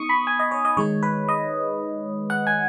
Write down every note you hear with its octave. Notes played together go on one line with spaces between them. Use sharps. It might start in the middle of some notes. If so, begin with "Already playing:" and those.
Already playing: B3 D#4 C#6 D#6
B5
G#5
D#5
C#5
D#5
D#3 G#3 D#4 C#5
B4
D#5
F#5
G#5